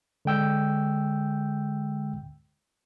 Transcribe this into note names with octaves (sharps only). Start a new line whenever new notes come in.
D3 G#3 G5 E6 G6